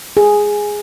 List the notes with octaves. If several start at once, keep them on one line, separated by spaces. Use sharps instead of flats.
G#4